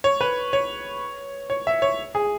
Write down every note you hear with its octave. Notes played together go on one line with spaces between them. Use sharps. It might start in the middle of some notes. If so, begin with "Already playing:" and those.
C#5
B4
C#5
C#5
E5
C#5
G#4